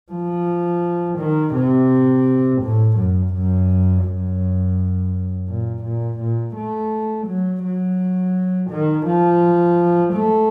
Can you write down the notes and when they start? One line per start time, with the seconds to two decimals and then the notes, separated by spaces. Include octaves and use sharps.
0.12 F3
1.19 D#3
1.55 C3
2.62 A2
2.98 F#2
3.34 F#2
4.06 F#2
5.49 A#2
5.84 A#2
6.20 A#2
6.56 A3
7.27 F#3
7.64 F#3
8.71 D#3
9.07 F3
10.14 A3